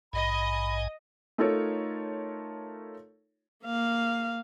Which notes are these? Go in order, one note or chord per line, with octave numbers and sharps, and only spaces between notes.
A#1 G#2 D#5 G#5 B5
A3 D#4 F4 A4 A#4 C#5
A#3 F5